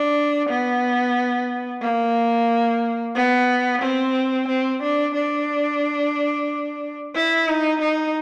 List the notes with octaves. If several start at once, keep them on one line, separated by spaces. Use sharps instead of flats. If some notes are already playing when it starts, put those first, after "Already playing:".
Already playing: D4
B3
A#3
B3
C4
C4
D4
D4
E4
D#4
D#4